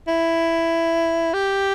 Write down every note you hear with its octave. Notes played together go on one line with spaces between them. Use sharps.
E4
G4